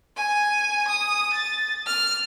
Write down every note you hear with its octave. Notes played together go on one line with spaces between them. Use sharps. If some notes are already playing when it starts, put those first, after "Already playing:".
G#5
D#6
A6
F6